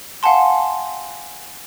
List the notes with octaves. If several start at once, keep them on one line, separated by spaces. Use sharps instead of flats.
F5 F#5 G#5 A5 C6